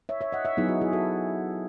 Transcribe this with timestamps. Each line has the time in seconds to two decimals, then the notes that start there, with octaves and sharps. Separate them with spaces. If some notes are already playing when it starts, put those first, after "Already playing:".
0.09 C#5 E5
0.21 C#5 E5
0.32 D#5 F#5
0.45 C#5 E5
0.57 F#3 B3 D#4 E4 G#4
0.68 F#4
0.81 E4 G#4
0.93 F#4 A4